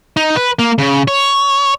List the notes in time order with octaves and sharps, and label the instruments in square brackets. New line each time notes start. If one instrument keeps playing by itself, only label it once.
[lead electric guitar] D#4
B4
A#3
C#3
C#5